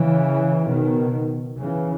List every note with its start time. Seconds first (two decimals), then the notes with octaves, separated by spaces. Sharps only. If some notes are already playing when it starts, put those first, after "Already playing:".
Already playing: C#3 E3
0.67 B2 D#3
1.59 C#3 E3